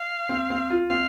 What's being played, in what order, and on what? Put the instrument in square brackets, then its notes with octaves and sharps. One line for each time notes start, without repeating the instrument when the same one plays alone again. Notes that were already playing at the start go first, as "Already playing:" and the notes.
Already playing: [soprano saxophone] F5
[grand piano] C4
C4
F4
[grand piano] C4 [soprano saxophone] F5